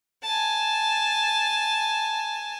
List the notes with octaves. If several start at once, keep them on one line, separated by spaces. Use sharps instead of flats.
G#5 A5